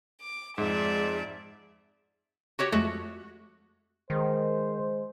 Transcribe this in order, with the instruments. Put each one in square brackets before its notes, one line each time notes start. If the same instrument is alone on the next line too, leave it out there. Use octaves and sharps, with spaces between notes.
[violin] D6
[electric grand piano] F2 G#2 [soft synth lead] G#3 [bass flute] G#4 [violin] D5 E5
[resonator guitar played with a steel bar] F#4 G4 C#5
[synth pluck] F2 G#3 A3 [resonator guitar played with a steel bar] F#4
[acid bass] D#3 [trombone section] G#3 C5